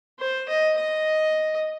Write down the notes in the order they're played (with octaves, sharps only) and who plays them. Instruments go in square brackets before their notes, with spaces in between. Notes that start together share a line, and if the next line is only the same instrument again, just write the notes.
[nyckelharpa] C5
D#5
D#5